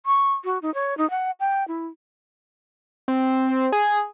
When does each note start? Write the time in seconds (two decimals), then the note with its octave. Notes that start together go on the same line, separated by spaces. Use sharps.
0.06 C#6
0.44 F#4
0.62 D#4
0.74 C#5
0.98 D#4
1.10 F#5
1.40 G5
1.68 E4
3.08 C4
3.72 G#4